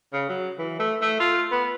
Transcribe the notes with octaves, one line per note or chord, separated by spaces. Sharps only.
C#3
F#3
E3
A3
A3
F4
B3